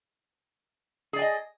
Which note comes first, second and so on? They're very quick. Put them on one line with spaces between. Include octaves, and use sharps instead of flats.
G#4 D5 G#5 D#5